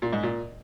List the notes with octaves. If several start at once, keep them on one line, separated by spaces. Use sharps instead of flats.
A#2
G#2
A#2